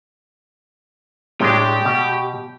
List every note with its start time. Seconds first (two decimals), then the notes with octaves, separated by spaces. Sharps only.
1.41 A2 G#3 D4 G4 G5
1.85 B2